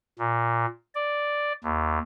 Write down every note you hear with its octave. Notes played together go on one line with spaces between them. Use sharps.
A#2
D5
D#2